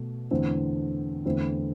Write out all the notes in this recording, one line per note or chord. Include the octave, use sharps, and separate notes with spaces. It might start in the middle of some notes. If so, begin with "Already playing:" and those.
Already playing: B2 A3
E2 D3 A3 C4
E2 D3 A3 C4 E4